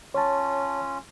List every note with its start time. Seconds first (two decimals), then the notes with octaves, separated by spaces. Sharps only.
0.14 C#4 F4 C#5 A5